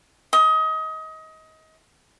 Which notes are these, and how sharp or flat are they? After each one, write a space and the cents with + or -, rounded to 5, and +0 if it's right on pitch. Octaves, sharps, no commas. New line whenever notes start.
D#5 +25